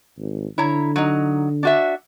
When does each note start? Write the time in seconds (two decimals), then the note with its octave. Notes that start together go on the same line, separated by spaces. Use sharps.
0.18 G#1
0.58 D3 E4 C#5 A#5
0.96 F#3 D#4
1.63 D4 F#4 E5